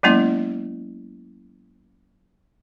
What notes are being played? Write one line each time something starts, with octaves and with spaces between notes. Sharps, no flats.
F#3 G#3 A#3 B3 C#4 E4